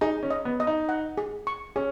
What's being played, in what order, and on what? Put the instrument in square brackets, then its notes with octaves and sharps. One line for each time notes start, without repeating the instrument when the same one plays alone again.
[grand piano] D#4 [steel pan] G#4
[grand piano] C#4
[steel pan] D#5
[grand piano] B3
[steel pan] D#5
[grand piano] D#4
[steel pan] F#5
G#4
C#6
[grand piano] C#4 [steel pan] G#4